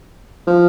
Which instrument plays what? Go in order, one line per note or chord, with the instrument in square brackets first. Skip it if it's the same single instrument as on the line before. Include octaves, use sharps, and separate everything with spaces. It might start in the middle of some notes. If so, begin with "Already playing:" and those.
[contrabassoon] F3